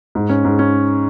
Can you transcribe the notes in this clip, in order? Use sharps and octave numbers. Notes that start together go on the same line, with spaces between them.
G#2
C#4
G#2
C#4